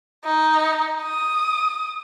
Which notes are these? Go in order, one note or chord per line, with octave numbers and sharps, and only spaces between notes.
D#4
D#6